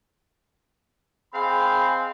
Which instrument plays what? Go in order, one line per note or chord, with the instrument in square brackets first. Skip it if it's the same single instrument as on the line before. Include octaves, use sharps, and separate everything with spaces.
[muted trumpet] C4 [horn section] G#4 F5 [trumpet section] D#5 G#5 B5